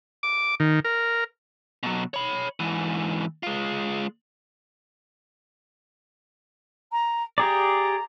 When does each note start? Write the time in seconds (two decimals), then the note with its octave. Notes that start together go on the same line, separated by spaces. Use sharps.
0.23 D6
0.60 D#3
0.85 A#4
1.83 B2 F#3
2.14 C#5 B5
2.60 G#2 E3
3.43 G#3 F4
6.92 A#5
7.38 G4 G#4 D5 A#5